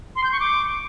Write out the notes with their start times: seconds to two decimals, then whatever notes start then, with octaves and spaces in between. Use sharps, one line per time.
0.16 C6
0.24 G6
0.32 C#6
0.40 D6